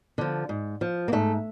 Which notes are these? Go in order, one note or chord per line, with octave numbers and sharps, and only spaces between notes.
D3 F3
G#2
F3
A#3
G#2 A3